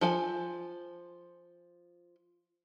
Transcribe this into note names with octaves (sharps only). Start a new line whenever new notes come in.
F3 A4 G#5